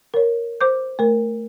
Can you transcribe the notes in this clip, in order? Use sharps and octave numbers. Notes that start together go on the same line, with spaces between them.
A#4 C#5
C5 D6 G6
A3 A#4